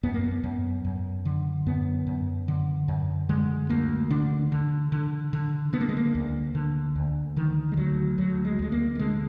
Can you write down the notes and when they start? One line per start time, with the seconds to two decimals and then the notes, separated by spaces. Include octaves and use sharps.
0.03 F#2 B3
0.14 A#3
0.24 B3
0.44 F#2
0.85 F#2
1.25 D3
1.66 F#2 B3
2.07 F#2
2.48 D3
2.88 F#2
3.29 D3 G#3
3.69 D2 A#3
4.10 D3 D4
4.52 D3
4.92 D3
5.33 D3
5.73 D3 B3
5.81 A#3
5.89 G#3
5.97 A#3
6.15 D2
6.55 D3
6.95 D2
7.36 D3 D#3
7.72 G#3
7.77 D2 F#3
8.18 D2 F#3
8.45 G#3
8.59 D2 G#3
8.72 A#3
8.95 A#3
8.99 D3 G#3